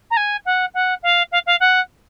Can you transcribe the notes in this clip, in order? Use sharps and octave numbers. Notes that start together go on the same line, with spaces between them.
A#5
G#5
F#5
F#5
F5
F5
F5
F#5